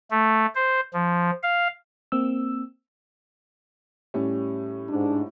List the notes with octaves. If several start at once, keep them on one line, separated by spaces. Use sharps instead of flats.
A3
C5
F3
F5
A#3 C4 E6
A2 G3 C#4
G#2 D4